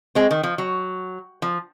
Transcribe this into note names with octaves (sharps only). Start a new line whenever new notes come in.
G#3 C4
D#3
F3
F#3
F3